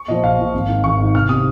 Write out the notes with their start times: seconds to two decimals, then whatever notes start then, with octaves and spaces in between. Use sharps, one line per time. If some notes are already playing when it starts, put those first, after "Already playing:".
Already playing: C#6
0.08 A#2 F3 D#5
0.23 A#1 F5
0.39 A#2 F3
0.54 G#1
0.69 G#2 D#3
0.84 G#1 C#6
0.99 G#2 D#3
1.14 C2 F6
1.29 C3 D#3 D#6